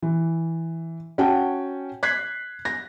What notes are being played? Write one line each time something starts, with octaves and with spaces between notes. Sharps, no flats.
E3
C#4 F#4 F#5 G5 A5
F#6 G#6 B6 C7
A#6